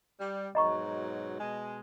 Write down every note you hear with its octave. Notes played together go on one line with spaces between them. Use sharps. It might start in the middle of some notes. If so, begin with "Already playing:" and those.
G3
G#2 B2 F#3 D#5 A#5 C#6
B2 G#3